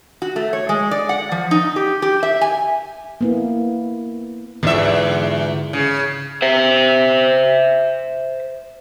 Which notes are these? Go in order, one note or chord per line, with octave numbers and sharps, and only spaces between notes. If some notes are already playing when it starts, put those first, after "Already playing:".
F#4
A3
C#5
G#3
D5
F#5
F3
D#4
G4
G4
E5
G#5
A#3 B3 E4
E2 G#2 D3 E5
C#3
C5 E5